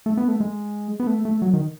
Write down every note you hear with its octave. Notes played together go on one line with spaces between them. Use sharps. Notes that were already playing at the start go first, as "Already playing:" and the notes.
A3
B3
A3
G#3
B3
A3
A3
F#3
D#3